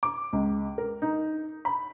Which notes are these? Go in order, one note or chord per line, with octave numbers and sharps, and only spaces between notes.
D6
C#2
A#4
D#4
B5